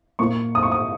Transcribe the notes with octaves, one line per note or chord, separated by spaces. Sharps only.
A#2 A#3 C#6
D#6
C#6
D#6